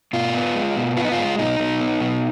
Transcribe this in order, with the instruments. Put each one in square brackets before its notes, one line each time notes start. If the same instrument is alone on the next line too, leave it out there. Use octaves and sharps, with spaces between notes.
[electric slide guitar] B2 F4
B3
G#3
B2
B3 F4
D#4
F4
G#3
B2 D#4
B2
B3
B2